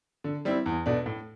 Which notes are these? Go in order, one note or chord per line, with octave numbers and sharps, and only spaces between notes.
D3
G3 C4 E4
E2
B2 A3 D4
A2